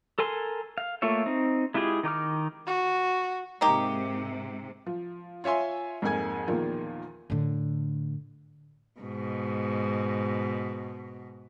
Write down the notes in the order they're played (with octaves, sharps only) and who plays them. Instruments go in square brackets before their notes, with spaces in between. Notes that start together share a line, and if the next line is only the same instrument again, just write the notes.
[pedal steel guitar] A4 A#4 G#5 C6
F5
A3 A#3 F4 C#5 E5
C4 D#4
G#3 E4 F4 G4 G#4
D#3 D#4 D6 F6
[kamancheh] F#4
[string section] G#2 C3 [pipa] A#3 D#4 G4
[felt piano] F3
F4 C#5 E5 G#5 C6
F2 G#2 A#3 G#5 G#6
E2 A#2 D#3 F3
[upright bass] A2 D3
[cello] G#2 B2